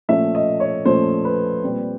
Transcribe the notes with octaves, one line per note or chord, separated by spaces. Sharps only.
A#2 F3 A3 C#4 E5
D#5
C#5
A#2 F3 A3 C#4 C5
B4
A#2 G3 C4